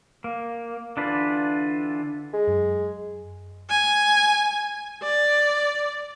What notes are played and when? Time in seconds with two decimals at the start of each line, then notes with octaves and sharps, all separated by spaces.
0.24 A#3
0.97 D3 E3 D4 F4 B4
2.33 G#3
2.47 F#2
3.70 G#5
5.03 D5